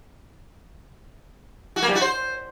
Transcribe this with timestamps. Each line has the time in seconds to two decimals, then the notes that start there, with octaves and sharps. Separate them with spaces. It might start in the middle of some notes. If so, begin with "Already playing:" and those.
1.76 F#4
1.82 A#3
1.89 G3
1.95 F#4
2.01 C5